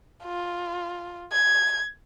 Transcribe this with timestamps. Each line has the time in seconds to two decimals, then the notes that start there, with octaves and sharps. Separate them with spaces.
0.24 F4
1.32 G#6